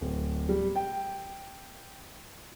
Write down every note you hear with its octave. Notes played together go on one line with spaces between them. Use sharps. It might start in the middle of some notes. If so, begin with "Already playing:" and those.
D1
G3
G5